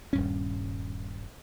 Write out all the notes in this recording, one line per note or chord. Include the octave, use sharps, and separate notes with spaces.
D#1 G2 C#4